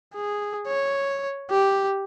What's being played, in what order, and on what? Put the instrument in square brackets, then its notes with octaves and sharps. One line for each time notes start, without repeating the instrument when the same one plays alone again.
[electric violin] G#4
C#5
G4